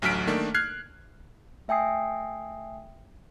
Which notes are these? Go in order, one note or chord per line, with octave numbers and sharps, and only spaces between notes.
A1 D2 F#3 F6 B6 D7
D#3 A3 A#3 D4
F6 F#6 G#6 C7
A3 E5 G5 G#5 D#6 C7